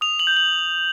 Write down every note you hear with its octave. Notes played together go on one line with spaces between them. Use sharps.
D#6 F7
F#7
G6
F#7